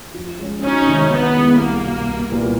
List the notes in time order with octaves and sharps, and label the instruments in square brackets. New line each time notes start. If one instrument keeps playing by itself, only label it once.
[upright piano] F3
G#3 C#4
[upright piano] D2 [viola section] C#4 D#4
[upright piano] C3 D#3 G#3
[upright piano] D#3 [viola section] B3
[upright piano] G#3 C#4 E4 G#4
[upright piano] C2 [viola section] A#3
[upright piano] B2 G3
C2
A#2 G3 B3 E4